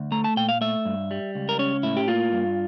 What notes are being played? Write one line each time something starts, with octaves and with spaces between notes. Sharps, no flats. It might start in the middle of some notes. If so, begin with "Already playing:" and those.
Already playing: D2
A3 A#5
A5
A#2 G5
F5
A3 E5
G2
G3
C#2
A#4
C#4 C#5
A2 E4
G4
A#3 F4
G2